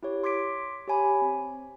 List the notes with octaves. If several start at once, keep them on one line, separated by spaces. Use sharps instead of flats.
E4 G4 C#5
C6 D6 G#6 B6 D7
G4 C#5 G#5 B5
C4